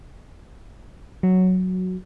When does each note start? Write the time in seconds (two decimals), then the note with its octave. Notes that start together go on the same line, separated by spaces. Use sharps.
1.23 F#3